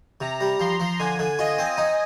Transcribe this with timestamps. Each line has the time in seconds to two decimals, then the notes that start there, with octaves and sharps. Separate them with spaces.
0.21 C3 A#5
0.40 G3
0.60 F3 C6
0.80 F3
0.99 D3 G#5
1.19 D3
1.39 F4 D#5
1.59 C4
1.78 D#4